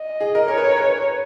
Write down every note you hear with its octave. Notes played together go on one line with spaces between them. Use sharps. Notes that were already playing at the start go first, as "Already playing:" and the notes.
Already playing: D#5
G#4
A#4
A#4 C#5
B4
A#4
B4